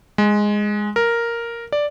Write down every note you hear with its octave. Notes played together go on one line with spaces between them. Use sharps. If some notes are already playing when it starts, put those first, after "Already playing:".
G#3
A#4
D5